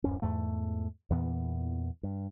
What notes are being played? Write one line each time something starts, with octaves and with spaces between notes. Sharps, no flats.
D1 F#2 C#4
E2 G#2 A3
E2 A#2 E3 B3
G2